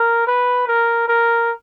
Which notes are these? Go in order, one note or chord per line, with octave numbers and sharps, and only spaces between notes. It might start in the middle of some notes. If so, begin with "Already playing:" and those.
Already playing: A#4
B4
A#4
A#4